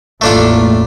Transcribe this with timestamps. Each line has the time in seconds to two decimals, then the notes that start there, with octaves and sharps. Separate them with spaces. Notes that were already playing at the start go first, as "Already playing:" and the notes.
0.21 A1 E2 A2 A3 A#3 D4 F4